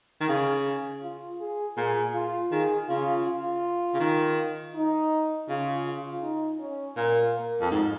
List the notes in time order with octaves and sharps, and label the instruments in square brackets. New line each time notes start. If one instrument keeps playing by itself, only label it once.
[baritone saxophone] D#3
[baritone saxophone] C#3 [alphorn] G#4
[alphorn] F4
G#4
[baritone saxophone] A#2 [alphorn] G#4
[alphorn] F4
[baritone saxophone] D#3 [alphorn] G#4
[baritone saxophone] C#3 [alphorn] F4
[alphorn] F4
[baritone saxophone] C#3
D#3
[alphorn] D#4
[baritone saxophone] C#3 [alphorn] F4
[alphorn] F4
D#4
C#4
[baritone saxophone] A#2 [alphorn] A#3
[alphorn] A#3
[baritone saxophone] F2
G#2